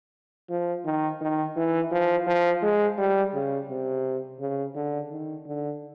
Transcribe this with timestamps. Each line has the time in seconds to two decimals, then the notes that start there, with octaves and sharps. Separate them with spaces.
0.50 F3
0.85 D#3
1.21 D#3
1.56 E3
1.92 F3
2.27 F3
2.63 G#3
2.98 G3
3.34 C#3
3.69 C3
4.40 C#3
4.75 D3
5.11 D#3
5.46 D3